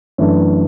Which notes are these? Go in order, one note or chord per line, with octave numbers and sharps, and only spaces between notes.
F#2 E3 A3 D4